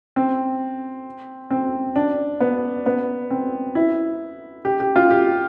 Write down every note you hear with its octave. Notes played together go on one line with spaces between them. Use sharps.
C4
C4
D4
B3
B3
C4
E4
G4
G4
F4
G4